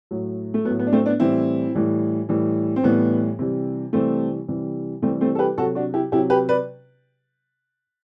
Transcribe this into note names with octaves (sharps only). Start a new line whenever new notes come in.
A2 F#3
A3
F#3 B3
A2
B3
D4
A3 C4
B3 D4
A2 E3 G3 C4 E4
A2 E3 G3
A2 E3 G3
C4
A2 E3 G3 B3
C3 E3 G3
C3 E3 G3 A3 C4
C3 E3 G3
C3 E3 G3 A3 C4
A3 C4
A4
G4 B4
C3 F#3 F#4 A4
D4 F#4
E4 G4
C3 F#3 E4 G4
G4 B4
B4 D5